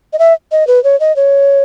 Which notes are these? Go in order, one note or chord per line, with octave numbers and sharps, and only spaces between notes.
D#5
E5
D#5
B4
C#5
D#5
C#5